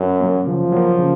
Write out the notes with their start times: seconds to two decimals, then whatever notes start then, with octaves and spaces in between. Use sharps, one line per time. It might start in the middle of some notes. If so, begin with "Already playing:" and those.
Already playing: F#2
0.21 F#3 A#3
0.47 C#3 F3
0.72 F#3 A#3
0.99 C#3